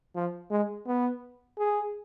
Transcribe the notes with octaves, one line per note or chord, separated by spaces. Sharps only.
F3
G#3
B3
G#4